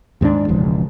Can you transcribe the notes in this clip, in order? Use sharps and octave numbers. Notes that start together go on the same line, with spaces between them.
D#2 G#2 G#3 D4
E1 C#2 F3